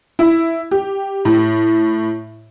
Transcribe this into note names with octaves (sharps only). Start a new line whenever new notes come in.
E4
G4
A2